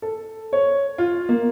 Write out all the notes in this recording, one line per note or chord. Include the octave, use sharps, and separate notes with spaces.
A4
C#5
F4
A#3